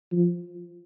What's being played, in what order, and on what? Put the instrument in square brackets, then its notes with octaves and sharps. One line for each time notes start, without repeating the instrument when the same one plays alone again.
[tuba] F3